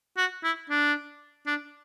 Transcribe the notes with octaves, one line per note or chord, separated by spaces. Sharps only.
F#4
E4
D4
D4